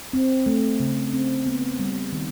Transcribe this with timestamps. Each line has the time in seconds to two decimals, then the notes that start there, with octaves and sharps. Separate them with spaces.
0.13 C4
0.46 A3
0.80 C#3
1.13 C4
1.46 B3
1.80 G3
2.13 D#3